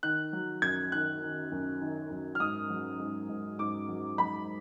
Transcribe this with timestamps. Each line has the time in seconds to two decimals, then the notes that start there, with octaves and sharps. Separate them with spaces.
0.03 D#3 F#6
0.33 F#3
0.62 F#2 G#6
0.92 D#3 F#6
1.21 D#3
1.51 F#2
1.81 D#3
2.10 F#2
2.35 F6
2.40 G#2 D#6
2.70 F#3
2.99 G#2
3.29 G#2
3.59 G#2 D6
3.88 F#3
4.18 F#3 B5